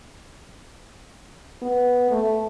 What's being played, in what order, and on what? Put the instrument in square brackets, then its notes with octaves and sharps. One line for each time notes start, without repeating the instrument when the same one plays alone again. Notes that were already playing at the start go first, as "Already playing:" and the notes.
[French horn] B3
A3